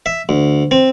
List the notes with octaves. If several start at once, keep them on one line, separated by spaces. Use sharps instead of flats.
E5
D2
C4